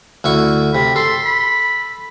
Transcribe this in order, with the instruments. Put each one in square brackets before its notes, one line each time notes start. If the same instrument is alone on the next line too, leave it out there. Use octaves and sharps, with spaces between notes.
[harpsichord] D2 E4 C#6
[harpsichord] C3 [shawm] B5
[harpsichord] A4 [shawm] C6
[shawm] B5